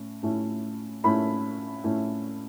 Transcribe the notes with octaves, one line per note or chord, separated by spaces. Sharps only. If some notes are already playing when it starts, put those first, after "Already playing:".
Already playing: A2 A3 C#4
A2 A3 C#4 E4
A2 A3 C#4 E4 B5
A2 A3 C#4 E4